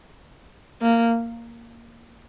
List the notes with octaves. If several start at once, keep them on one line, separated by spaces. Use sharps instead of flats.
A#3